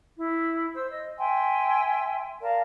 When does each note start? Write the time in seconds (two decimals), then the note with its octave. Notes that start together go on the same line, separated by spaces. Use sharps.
0.18 E4
0.75 C5 E6
0.89 D#5
1.18 E5 G5 G#5 C6
2.42 A#4 D5 F5 A5